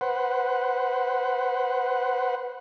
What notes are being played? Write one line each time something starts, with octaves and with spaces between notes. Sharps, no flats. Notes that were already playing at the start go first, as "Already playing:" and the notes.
B4 C5 F#5